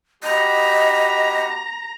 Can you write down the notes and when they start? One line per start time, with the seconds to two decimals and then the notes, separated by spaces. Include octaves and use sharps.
0.23 F#4 G4 D#5 A#5 B5